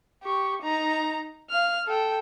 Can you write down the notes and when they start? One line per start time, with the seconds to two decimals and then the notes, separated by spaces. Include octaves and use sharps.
0.23 G4 C#6
0.62 D#4 A#5
1.50 F5 F6
1.87 A4 G5